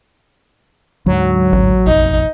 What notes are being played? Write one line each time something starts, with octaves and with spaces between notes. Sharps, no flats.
D2 G#2 F#3
A1
B1 F2 D#4